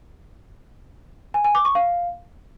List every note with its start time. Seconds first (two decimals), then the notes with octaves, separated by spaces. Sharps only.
1.34 G#5
1.45 G#5
1.55 D6
1.65 C#6
1.75 F5